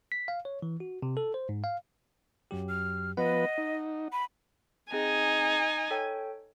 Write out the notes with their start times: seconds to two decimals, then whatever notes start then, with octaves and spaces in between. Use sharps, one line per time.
0.12 B6
0.28 F5
0.45 C#5
0.62 E3
0.80 F#4
1.02 C3
1.17 A4
1.34 C5
1.49 G#2
1.64 F5
2.51 F#2 F#3 G4
2.69 F6
3.17 F3 B3 B4 D#5 F#5
3.58 D#4
4.12 B5
4.92 C4 D#4 G#4 G#5
5.91 A4 C#5 G5